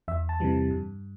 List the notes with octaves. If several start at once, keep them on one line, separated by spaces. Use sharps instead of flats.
E2 E5
A5
C3 E3 G3
G2